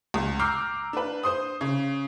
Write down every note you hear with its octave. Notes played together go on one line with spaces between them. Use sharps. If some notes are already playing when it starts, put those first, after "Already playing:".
C#2
A#5 D6 E6 F6 G6 C7
D4 B4
C5 C6 D#6
C#3